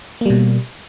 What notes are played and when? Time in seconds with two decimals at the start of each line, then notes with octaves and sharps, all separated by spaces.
0.21 A#3
0.26 G3
0.30 B2